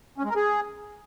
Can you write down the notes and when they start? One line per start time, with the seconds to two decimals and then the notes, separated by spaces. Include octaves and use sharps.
0.18 C#4
0.24 G#3
0.30 A#4
0.36 G#4